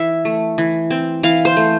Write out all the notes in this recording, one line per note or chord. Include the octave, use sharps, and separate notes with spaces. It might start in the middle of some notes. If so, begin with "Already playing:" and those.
Already playing: E3 E5
A3
E3
C4
E3 F5
C5
A3